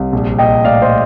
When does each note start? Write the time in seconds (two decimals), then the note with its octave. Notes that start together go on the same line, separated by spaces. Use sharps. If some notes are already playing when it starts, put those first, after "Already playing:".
Already playing: C2
0.13 A#1
0.39 A#1 D#5 G5
0.65 A2 D5 F5
0.82 C5 D#5